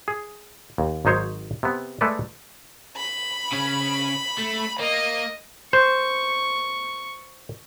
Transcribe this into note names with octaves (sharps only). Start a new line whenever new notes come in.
G#4
D#2
G#1 F#3 D#4 C5 C#5
C3 B3
G#3 A3 A4 B4 D5
B5
C#3 C#4
A3
A#3 D#5
C5 C#6